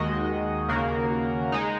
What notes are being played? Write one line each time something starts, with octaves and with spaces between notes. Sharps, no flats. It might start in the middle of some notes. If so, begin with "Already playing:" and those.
Already playing: D#2 D#3 G#3 F#4 D#5
D#2 C#3 A#3 F#4 A#4
G#3 D#4